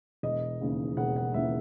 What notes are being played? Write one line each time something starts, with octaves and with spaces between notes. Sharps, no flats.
E1 D#5
D#2 C#3 E3
E1 F#5
F#5
D#2 C#3 E3 E5